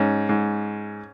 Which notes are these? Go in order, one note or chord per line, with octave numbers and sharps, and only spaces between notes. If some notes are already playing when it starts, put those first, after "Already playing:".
Already playing: G#2 C#4
G#2